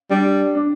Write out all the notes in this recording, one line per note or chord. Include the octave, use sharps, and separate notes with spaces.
G3 D4
D4